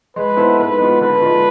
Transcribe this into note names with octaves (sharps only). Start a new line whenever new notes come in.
G#3 B4
B3 E4 A4 C5
G#2 B4
G#3 B3 F4
D3 B4
G#3 D4 F4